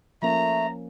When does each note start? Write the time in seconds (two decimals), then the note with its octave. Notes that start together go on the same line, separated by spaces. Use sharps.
0.22 F3 A3 A#3 C#4 A#5